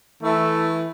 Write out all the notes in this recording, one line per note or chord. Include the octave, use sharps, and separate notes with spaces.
E3 A3